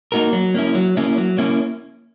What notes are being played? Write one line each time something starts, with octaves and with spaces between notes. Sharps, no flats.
A#3 D#4 F#4 A#4
F#3
A#3 C#4 E4
F#3
A#3 C#4 E4
F#3
A#3 C#4 E4